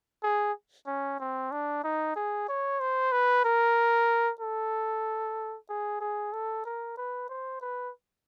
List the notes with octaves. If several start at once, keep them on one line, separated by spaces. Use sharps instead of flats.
G#4
C#4
C4
D4
D#4
G#4
C#5
C5
B4
A#4
A4
G#4
G#4
A4
A#4
B4
C5
B4